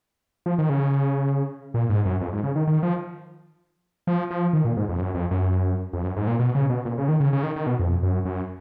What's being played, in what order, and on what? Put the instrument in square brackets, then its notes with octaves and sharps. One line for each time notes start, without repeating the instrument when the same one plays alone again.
[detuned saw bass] F3
D#3
C#3
A#2
G#2
F#2
F2
G#2
C#3
D#3
D#3
F3
F3
F3
D#3
A#2
G#2
F2
F#2
F2
F#2
F2
F#2
G#2
A#2
B2
C#3
B2
A#2
C#3
D#3
C#3
C#3
D#3
D#3
B2
F2
F#2
F#2